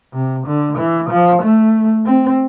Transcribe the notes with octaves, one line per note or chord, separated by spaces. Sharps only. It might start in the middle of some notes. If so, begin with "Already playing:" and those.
C3
D3
E3
F3
A3
C4